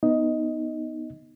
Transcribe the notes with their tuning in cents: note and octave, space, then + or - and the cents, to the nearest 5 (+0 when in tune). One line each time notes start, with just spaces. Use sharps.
B3 +0 D#4 +0 D#5 +5